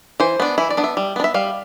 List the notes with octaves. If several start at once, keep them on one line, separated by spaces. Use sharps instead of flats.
E3 C5
B3 D4
E3 E4
D5
B3 D4
E5
G3
B3 D4
E5
G3 F5